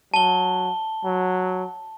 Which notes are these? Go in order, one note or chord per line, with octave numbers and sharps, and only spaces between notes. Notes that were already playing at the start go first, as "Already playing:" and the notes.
F#3 A5 G7
F#3